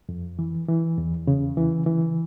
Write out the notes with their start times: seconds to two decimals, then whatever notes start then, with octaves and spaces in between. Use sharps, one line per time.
0.09 F2
0.39 E3
0.68 E3
0.98 E2
1.27 C#3
1.57 E3
1.87 E3